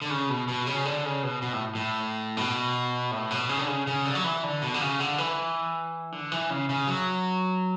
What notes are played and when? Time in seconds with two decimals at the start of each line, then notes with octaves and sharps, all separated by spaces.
0.02 D3
0.10 C#3
0.29 B2
0.48 B2
0.67 C#3
0.85 D3
1.05 C#3
1.23 B2
1.42 B2
1.53 A2
1.75 A2
2.37 B2
3.11 A2
3.30 B2
3.49 C#3
3.59 D3
3.68 C#3
3.87 C#3
4.06 D3
4.15 F#3
4.24 E3
4.43 D3
4.62 B2
4.74 D3
4.81 C#3
5.00 D3
5.18 E3
6.12 D3
6.32 E3
6.50 C#3
6.69 C#3
6.87 F#3